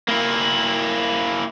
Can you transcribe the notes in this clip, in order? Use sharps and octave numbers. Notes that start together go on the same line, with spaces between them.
A#3 E4